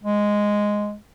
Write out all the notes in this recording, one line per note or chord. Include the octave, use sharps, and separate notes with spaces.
G#3